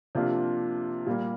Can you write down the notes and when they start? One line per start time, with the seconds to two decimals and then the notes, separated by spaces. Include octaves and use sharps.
0.15 C3 F3 A#3 D4 F4
1.06 A#2 G3 A#3